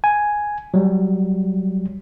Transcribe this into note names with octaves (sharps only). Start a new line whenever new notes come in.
G#5
F#3 G3